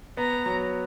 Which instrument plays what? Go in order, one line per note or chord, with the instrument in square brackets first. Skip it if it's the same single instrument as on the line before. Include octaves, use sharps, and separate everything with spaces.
[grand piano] B3 [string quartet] A#5
[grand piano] F#3